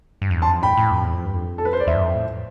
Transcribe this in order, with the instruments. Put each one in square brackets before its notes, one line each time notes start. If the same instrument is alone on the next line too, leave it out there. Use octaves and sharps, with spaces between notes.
[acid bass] G2
F2
E2
[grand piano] A5 C6
[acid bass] F2
[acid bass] A2 [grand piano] G5 B5
[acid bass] A2
F2
E2
F2
G2
F2
[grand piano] A4
B4
C5
D5
[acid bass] E2 [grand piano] C5 E5
[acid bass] G2
F2
A2